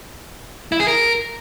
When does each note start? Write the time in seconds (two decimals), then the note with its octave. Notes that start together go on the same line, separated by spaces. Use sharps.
0.72 E4
0.80 G#4
0.88 A#4